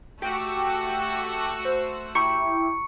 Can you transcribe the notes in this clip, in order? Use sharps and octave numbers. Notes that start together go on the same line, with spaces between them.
A3 F#4 G4 E6
C5
E4 G4 A#5 C#6 C#7